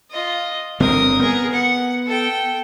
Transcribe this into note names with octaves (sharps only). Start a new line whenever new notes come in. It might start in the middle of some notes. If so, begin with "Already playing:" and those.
F4 D#5
G1 D3 C4 A#4 D#6
B3 G#4 A#4
F#5
A4 G5